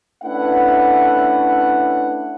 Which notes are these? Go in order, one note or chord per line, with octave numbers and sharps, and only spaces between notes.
A3 C#4 D4 E4 B4 F#5